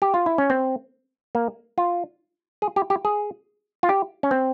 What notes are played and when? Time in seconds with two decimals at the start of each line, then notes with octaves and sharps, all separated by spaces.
0.02 G4
0.14 F4
0.26 E4
0.38 C#4
0.50 C4
1.35 A#3
1.78 F4
2.62 G#4
2.76 G4
2.90 G4
3.05 G#4
3.83 F4
3.89 G4
4.23 C#4
4.31 C4